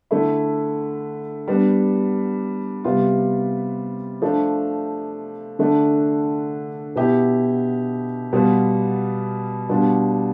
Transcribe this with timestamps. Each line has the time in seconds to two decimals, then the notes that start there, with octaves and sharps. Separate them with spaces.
0.11 D3 A3 E4
1.48 G3 B3 D4
2.84 C3 G3 B3 F4
4.22 F3 A3 D4
5.59 D3 A3 D4
6.96 B2 B3 E4 G4
8.33 B2 G3 B3 F4
9.69 B2 G3 D4 F4